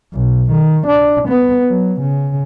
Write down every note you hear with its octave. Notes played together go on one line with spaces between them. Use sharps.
B1
D#3
D4
B3
F#3
C#3